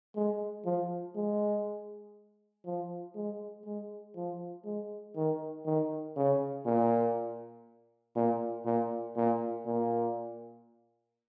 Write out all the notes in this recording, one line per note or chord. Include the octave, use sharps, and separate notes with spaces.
G#3
F3
G#3
F3
G#3
G#3
F3
G#3
D#3
D#3
C#3
A#2
A#2
A#2
A#2
A#2